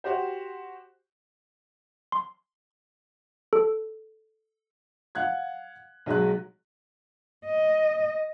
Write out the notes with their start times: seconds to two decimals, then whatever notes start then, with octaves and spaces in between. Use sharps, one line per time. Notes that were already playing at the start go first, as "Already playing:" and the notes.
0.04 F#4 G4 C5
2.12 C6
3.53 A4
5.15 F5 F#5 F#6 G#6
6.06 B1 F#3 G#3 F#6
7.46 D#5